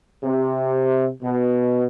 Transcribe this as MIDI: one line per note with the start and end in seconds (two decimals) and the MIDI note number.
0.24 1.07 48
1.22 1.86 47